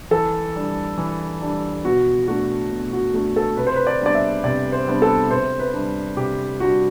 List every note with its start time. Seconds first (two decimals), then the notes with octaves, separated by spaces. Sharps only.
0.11 E3 A4
0.55 G3 D4
0.97 E3
1.41 G3 D4
1.85 B2 F#4
2.28 A3 D4 F#4
2.71 B2
2.93 F#4
3.14 A3 D4
3.36 A4
3.57 C3 B4
3.67 C5
3.76 B4
3.87 D5
4.01 G3 B3 D4 D5
4.15 E5
4.44 C3 D5
4.72 C5
4.87 G3 B3 D4
5.02 A4
5.30 C3 C5
5.59 B4
5.73 G3 D4
6.17 C3 G4
6.60 G3 D4 F#4